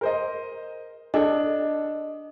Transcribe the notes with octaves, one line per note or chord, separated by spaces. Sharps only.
A#4 C5 D#5
D4 A4 D#5